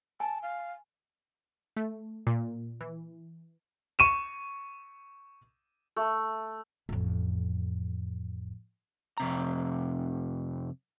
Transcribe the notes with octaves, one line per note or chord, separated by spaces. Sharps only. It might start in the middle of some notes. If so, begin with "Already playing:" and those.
G#5 A5
F5
A3
A#2
E3
C#6 D#7 E7
A3
A1 F2
F2 C3 A#5